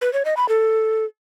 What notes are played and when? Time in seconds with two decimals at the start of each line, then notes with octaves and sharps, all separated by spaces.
0.01 B4
0.13 C#5
0.25 D#5
0.37 B5
0.49 A4